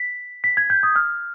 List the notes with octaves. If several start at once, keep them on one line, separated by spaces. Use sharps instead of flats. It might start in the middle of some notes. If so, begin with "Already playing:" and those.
Already playing: B6
B6
G#6
G6
D#6
F6